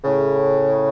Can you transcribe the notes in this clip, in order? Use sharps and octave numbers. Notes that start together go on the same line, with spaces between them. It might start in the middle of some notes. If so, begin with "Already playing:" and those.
A2 C#3